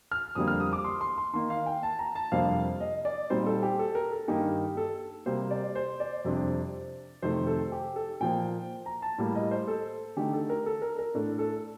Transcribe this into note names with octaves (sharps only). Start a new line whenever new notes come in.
F6
F2 D3 G3 A#3 D#6
F6
D#6
D6
C6
C6
C6
D#3 A#3 D#4 C6
F5
G5
A5
A#5
A5
F2 C3 G3 A#3 D4 F5
D#5
D5
A#2 G3 C4 D#4 C5
A4
G4
A4
A#4
A4
G2 D#3 A#3 D#4 G4
A4
C3 G3 A#3 C5
D5
C5
D5
F2 C3 G3 D4
F2 C3 D#3 A3 C5
A4
G4
A4
A#2 F3 A#3 G5
A#5
A5
A2 G3 A#3
D#5
C5
A4
D3 A3 D#4 G4
A4
A#4
A4
A#4
A#4
A2 A3 D4 A4
A4